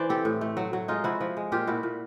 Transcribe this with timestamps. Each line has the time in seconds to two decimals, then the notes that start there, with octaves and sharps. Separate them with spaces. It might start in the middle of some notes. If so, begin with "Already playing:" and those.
Already playing: E3 C5 D5
0.09 C4 G4 A4
0.25 A2
0.41 A3
0.57 F#3
0.73 F#3
0.88 G#3 D#4 F4
1.04 F3 E4 F#4
1.21 F3
1.37 G#3
1.52 A#2 F4 G4
1.67 A#2 E4 F#4
1.83 A#2